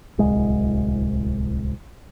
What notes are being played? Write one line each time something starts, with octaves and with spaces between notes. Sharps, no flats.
D1 C2 G#3